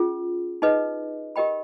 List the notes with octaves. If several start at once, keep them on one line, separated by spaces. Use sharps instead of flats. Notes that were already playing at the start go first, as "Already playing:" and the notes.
Already playing: C#4 F4 G#4
D#4 G#4 B4 D#5
G4 A#4 D#5 G5 B5